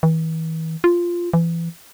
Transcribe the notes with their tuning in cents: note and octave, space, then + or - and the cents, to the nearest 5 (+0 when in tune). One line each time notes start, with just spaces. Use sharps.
E3 -40
F4 -5
E3 +25